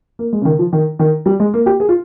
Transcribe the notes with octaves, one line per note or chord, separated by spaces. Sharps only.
A#3
G#3
C#3
D#3
F3
D#3
D#3
G3
G#3
A#3
G4
G#4
F4